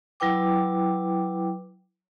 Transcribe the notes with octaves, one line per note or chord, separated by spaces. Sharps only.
F#3 E4 B4 G5 D6